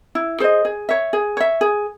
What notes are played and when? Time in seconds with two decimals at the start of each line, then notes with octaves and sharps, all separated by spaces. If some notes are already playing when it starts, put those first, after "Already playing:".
0.15 E4
0.40 G#4 C5 D#5
0.65 G#4
0.89 C#5 E5
1.13 G#4
1.37 C#5 E5
1.61 G#4